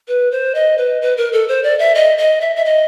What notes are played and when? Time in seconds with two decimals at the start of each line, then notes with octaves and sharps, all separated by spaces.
0.08 B4
0.32 C5
0.55 D#5
0.78 B4
1.02 B4
1.17 A#4
1.33 A4
1.48 C5
1.64 D5
1.79 E5
1.95 D#5
2.18 D#5
2.41 E5
2.56 E5
2.65 D#5